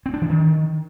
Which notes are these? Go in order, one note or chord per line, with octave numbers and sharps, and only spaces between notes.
C4
D4
E3
D#3